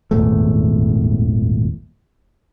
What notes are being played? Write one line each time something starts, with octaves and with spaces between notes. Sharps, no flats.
D#1 G#1 E2 A3